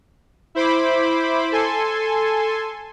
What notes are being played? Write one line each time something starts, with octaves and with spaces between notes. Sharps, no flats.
E4 C5 B5 D6
A4 G#5 C6